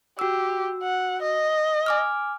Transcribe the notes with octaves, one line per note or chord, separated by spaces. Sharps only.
F#4 G4 E6
F#5
D#5
G#5 D6 F6